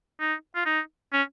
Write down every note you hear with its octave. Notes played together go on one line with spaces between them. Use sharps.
D#4
F4
D#4
C#4